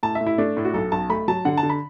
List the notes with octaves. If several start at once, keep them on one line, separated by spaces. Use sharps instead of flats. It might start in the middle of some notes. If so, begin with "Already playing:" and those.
A2 A5
E5
A2
E4
A3 D4
A2
F#4
B1 A4
B1 A5
A3 B5
F#3 A5
D3 F#5
A5
D3
B5